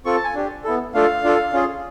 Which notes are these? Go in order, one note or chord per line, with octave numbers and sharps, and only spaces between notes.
C4 F4 A4 C#6
A5
G#5
D4 G4
B3 E4 A4
A3 D4 F4 A4 F5
D4 F4 A4
C#4 F4 G#4